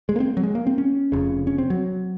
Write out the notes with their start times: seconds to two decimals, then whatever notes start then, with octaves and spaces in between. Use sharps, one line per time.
0.09 G#3
0.16 A#3
0.20 C4
0.37 F#3
0.43 G#3
0.55 A#3
0.67 C4
0.78 C#4
1.12 F1 F2 C#3
1.47 C#4
1.58 C4
1.70 F#3